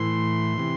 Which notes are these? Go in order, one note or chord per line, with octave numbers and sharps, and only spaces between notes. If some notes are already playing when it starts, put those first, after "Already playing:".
Already playing: A2 E3 C6
C3 E3